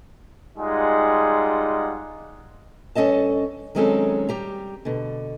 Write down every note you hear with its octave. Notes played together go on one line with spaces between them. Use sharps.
G3 G#3 D#4 F4 G#4 F#5
G2 C#4 A4 D#5 A5
D#3 F#3 G#3 C4 C#4 A4
G3 G4 A#5
B2 D3